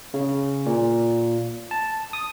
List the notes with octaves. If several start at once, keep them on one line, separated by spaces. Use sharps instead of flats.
C#3
A#2
A5
D#6